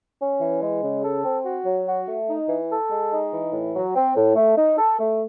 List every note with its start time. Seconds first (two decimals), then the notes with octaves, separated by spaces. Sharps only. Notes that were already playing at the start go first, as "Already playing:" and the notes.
0.20 C#4
0.41 E3
0.61 G#3
0.82 C#3
1.03 A4
1.24 C4
1.44 F#4
1.65 F#3
1.87 F#4
2.07 A3
2.28 D#4
2.48 E3
2.70 A4
2.90 G#3
3.11 D#4
3.31 E3
3.52 A2
3.74 F#3
3.95 C4
4.16 A2
4.35 A3
4.56 D#4
4.78 A4
4.99 A3